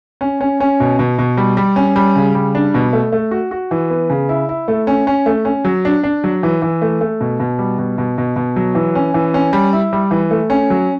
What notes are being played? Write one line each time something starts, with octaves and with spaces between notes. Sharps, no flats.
C#4
C#4
C#4
B2
B2
B2
G3
G3
C#4
G3
C#3
G3
D4
B2
A3
A3
F#4
F#4
E3
B3
C#3
E4
E4
A3
C#4
C#4
A3
C#4
F#3
D4
D4
F#3
E3
E3
A3
A3
B2
B2
G3
B2
B2
B2
B2
F#3
E3
C#4
E3
C#4
G3
E4
G3
E3
A3
C#4
F#3